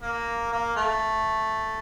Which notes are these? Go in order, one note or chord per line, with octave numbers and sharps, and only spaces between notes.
A#3
A#3
A3